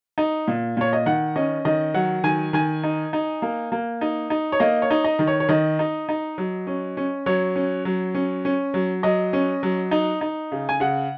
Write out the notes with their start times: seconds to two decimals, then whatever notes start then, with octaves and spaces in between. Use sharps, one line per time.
0.18 D#4
0.48 A#2
0.77 A#2 C#5
0.93 D#5
1.06 D#3 F#5
1.36 C#4 D#5
1.65 D#3 D#5
1.94 F#3 F#5
2.24 D#3 G#5
2.53 D#3 G#5
2.83 D#4
3.13 D#4
3.42 A#3
3.72 A#3
4.01 D#4
4.30 D#4
4.52 C#5
4.60 A#3 D#5
4.82 C#5
4.90 D#4
5.04 D#5
5.19 D#3
5.27 C#5
5.40 C#5
5.49 D#3 D#5
5.79 D#4
6.09 D#4
6.38 F#3
6.67 C#4
6.97 C#4
7.26 F#3 C#5
7.56 C#4
7.85 F#3
8.15 C#4
8.45 C#4
8.74 F#3
9.03 F#3 D#5
9.33 C#4
9.63 F#3
9.91 D#4
10.21 D#4
10.52 C#3
10.69 G#5
10.80 C#3 F#5